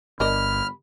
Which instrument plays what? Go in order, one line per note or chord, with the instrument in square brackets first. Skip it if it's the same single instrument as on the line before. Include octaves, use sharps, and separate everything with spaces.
[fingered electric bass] G1 [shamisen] D4 A#4 D#5 [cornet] B5 [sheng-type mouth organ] F6